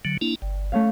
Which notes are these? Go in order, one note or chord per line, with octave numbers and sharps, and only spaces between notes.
D3 F#3
A#3 D4 E4
G1
A3 C#4 F5